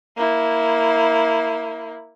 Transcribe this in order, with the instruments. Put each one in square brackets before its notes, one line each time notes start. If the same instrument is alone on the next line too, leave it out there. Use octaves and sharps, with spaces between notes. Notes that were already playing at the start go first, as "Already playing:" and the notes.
[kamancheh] A#3 E4